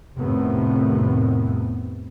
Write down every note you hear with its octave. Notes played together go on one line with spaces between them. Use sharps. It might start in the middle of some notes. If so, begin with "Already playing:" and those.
F1 A2 C3 D#3 B3